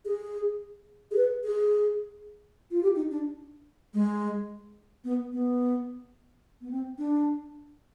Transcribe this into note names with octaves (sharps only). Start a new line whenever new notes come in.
G#4
G#4
B4
G#4
F4
G4
D#4
D4
G#3
B3
B3
B3
C4
D4